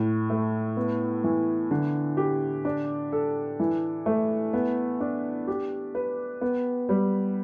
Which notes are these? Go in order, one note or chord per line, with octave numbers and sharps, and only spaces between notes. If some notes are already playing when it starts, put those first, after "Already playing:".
Already playing: A2
A3
B3
E3
D3
G4
D4
A4
E3
A3
B3
D4
G4
B4
B3
G3